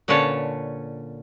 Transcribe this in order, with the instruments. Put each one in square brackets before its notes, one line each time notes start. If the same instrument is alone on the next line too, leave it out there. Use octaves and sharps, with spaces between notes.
[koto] A#2 D3 C#4 B4 C#5 A5